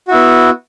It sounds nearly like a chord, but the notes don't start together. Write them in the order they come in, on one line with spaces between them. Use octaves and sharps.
F#4 E4 B3